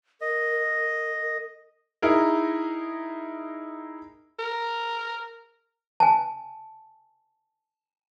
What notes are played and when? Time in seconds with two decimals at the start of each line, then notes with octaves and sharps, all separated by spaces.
0.21 A#4 D#5
2.02 D#4 E4 G#4 A#4
4.39 A#4
6.00 G#5 A5